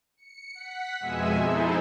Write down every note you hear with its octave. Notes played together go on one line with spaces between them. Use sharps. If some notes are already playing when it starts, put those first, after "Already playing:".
C#7
F#5 B6
F2 B2 G#3 E5 G#5 E6
D#4 E4 G#4 A4 C5